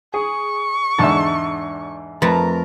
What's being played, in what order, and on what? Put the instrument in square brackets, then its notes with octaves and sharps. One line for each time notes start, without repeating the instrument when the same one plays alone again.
[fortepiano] G#4 [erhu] C#6
[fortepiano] E2 G#2 D3 [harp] E5 A5
[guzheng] F2 A3 [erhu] A#4 [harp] B4 A5 A#5